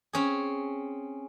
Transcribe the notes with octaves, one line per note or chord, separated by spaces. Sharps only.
C4 C#4 G#4